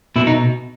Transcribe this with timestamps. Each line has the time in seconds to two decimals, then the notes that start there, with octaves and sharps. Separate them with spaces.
0.16 B2 E4
0.27 D#4